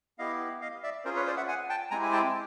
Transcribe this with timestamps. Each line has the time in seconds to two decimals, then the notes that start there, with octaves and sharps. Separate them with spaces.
0.18 B3 E4 G4 D#5 F5
0.61 D#5 F5
0.83 D5 E5
1.05 C#4 F4 G#4 A#4 C5
1.16 B4 C#5
1.26 C5 D5
1.37 E5 F#5
1.48 F#5 G#5
1.69 G5 A5
1.91 G#3 C4 E4 G4 G#5 A#5
2.02 G#5
2.12 G5 A5